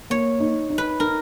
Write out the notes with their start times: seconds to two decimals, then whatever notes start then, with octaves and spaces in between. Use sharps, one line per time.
0.10 A#3 C#5
0.40 D#4
0.70 D#4
0.78 B4
1.00 D#4 A#4